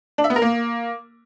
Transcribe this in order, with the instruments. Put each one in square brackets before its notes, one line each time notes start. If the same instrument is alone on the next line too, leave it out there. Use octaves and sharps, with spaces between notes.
[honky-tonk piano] D4
E5
B3
A#4
A#3